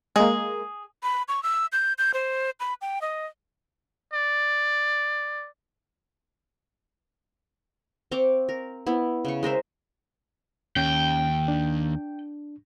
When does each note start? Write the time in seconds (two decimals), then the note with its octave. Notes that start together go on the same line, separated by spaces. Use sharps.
0.16 G#3 A#3 G#4
1.03 B5
1.28 C#6
1.43 E6
1.72 G6
1.98 G6
2.14 C5
2.60 B5
2.82 G5
3.02 D#5
4.14 D5
8.12 C4 F5 C#6 D6
8.49 A#4
8.87 B3 E4
9.25 C#3 C#6
9.43 G#3 A#4 C5 E5
10.76 D#2 C#4 G5
11.48 D4